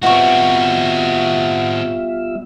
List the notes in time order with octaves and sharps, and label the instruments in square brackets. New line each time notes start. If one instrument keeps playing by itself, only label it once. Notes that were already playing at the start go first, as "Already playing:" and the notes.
[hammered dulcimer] B2 [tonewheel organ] G3 F4 E5 [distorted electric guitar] C4 F#4 [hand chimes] F#5 C#6